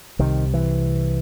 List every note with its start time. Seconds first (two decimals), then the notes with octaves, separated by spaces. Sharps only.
0.19 C2 C3 D#3
0.54 E3